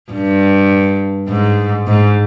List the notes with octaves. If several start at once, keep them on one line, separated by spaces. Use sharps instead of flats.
G2
G#2
G#2